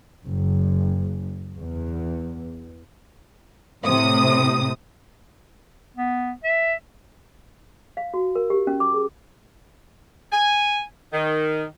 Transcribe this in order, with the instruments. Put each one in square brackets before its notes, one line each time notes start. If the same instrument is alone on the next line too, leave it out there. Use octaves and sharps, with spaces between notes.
[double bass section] F#1
E2
[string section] A2 C3 D#6
[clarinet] B3
E5
[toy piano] F5
F#4
A#4
G4
C#4
D6
G#4
[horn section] G#5
D#3